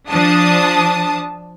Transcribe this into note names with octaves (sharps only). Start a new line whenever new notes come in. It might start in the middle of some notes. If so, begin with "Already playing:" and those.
F3 D4 A5 D#6